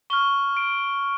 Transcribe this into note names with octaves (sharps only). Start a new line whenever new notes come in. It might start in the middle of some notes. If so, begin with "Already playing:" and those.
C#6 F6 G7
D7